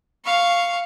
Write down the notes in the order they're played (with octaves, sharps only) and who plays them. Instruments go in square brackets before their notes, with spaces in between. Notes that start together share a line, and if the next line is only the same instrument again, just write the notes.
[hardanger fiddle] F5 C#6